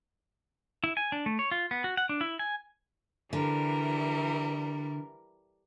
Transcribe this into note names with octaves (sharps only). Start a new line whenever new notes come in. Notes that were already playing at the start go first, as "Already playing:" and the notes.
E4
G#5
D4
A3
C#5
F4
B3
F#4
F#5
D4
E4
G#5
D3 E3 G3 A#4